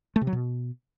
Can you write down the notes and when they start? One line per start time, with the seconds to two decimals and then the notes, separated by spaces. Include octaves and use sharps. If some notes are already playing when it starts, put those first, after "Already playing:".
0.16 A3
0.21 C3
0.27 F#3
0.33 B2